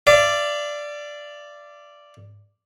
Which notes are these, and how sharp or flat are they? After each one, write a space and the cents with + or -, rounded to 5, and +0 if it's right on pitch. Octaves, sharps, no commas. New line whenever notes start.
D5 +0 F5 -45